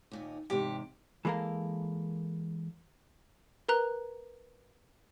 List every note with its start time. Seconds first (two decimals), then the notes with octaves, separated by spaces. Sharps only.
0.11 D#2 A#2 D#4
0.50 E2 G#2 C3 G4
1.25 E3 G#3 A#3 A4 A#4
3.69 A#4 B4 A#5 F#6